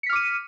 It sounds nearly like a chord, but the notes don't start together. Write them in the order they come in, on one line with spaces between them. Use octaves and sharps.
C#7 B6 F6 D6 D#7